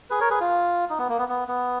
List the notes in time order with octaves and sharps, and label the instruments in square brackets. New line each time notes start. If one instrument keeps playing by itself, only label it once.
[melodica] G#4 B4
A#4 C#5
G#4 B4
F4
D#4
B3
A#3
B3
B3
B3